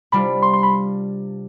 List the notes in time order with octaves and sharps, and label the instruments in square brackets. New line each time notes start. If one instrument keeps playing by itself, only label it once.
[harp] C3 G3 D4 F4 [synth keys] B5
[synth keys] C6
C6
B5